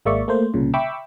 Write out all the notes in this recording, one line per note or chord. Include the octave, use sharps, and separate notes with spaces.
G#1 G#3 A#3 D5 E5 C#6
A3 A#3 C5
C2 A#2 C#3
E5 G5 B5 C#6 D6 E6